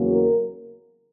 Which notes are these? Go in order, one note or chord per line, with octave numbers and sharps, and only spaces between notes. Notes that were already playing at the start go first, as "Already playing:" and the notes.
Already playing: E2 C#3 F#3 A#3
A#4